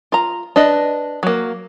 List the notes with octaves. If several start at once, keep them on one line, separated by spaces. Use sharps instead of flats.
F4 A#5
D4 B4 D#5
F#3 A#3